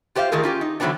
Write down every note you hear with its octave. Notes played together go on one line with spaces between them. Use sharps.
F4 G4 C5 D#5 F5
D#3 A3 F4 G#4 A#4
C#4 F4 G4
D#4
D3 E3 F#3 B3 C4 D4